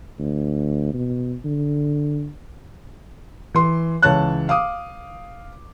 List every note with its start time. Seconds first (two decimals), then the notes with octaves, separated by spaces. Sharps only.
0.19 D2
0.93 B2
1.45 D3
3.54 E3 C6
4.02 C#2 E3 C#5 A5 F#6
4.49 F5 D6 D#6